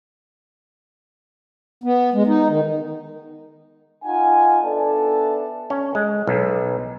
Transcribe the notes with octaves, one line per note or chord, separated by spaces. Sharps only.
B3
G#3
D#4
D#3
D#4 F4 F#5 G#5
B3 D4 A4 D5 E5 A5
C#4
G#3
B1